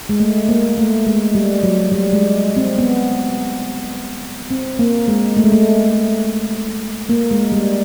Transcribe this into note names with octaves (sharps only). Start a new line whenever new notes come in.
G#3
A3
A#3
A3
G#3
G3
F#3
G3
G#3
C4
B3
C4
A#3
G#3
A3
G#3
A3
A#3
G#3
G3